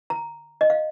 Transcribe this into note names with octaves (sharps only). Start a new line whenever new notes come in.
A#5
D#5
F5